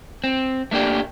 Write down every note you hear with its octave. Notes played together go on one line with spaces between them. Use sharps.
C4
A3 A#3 D4 G4